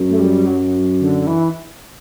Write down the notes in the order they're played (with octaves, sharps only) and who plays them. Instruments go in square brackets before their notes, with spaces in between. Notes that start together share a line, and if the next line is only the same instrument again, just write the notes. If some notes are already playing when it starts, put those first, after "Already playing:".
Already playing: [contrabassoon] F#2
[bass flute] A3
G3
F#3
D3
E3